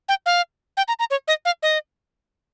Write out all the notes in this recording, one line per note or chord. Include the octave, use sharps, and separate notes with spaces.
G5
F5
G5
A#5
A#5
C#5
D#5
F5
D#5